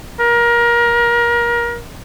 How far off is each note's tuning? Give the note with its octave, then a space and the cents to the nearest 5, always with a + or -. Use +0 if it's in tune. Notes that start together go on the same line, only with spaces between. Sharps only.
A#4 +25